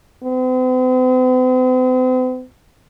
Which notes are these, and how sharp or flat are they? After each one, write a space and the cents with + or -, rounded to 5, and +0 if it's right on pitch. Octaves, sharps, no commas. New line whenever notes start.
C4 -45